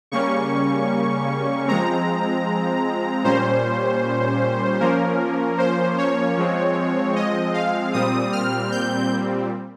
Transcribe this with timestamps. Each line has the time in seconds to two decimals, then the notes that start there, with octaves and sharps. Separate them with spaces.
0.12 C#3 G3 A#3 C#4 C#6
1.67 F3 G#3 C4 A#5
3.24 A#2 G3 C#4 C5
4.80 F3 A#3 C#4 A#4
5.58 C5
5.98 C#5
6.37 F3 G#3 C4
7.16 D#5
7.54 F5
7.93 A#2 G3 C4 D#6
8.32 F6
8.72 G6